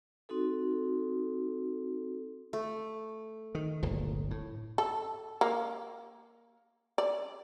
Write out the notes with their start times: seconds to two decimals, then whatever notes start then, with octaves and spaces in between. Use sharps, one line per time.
0.29 C4 D#4 F#4 A4
2.53 A3
3.55 D#3
3.83 D1 G1 A#2
4.31 A2
4.78 A4
5.41 A#3
6.98 D5